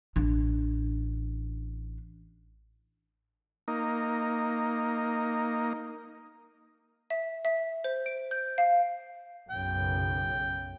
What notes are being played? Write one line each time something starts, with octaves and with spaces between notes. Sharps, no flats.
A1 D4
A#3 D#4
E5
E5
C5
D7
G6
F5
B1 F#2 C#3 G5